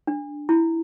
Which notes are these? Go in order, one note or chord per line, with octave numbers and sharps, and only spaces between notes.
D4
E4